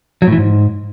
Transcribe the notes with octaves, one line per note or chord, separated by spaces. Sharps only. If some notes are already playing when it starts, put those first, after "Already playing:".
F#3
A2
E3
G#2